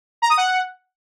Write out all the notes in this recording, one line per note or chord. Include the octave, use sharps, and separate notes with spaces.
A#5
D#6
F#5